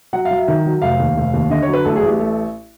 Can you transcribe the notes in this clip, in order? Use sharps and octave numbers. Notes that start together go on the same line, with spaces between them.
F#3 F#5
F5
F#3
E5
D#3
F#3
F1 F5
D#2
F1
D#2
D3 D#5
C#5
F#3
B4
A1 A4
G#4
A1
G4
A3